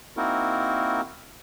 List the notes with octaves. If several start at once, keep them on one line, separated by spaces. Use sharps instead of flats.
A#3 C4 D#4 E4 F#4 A#4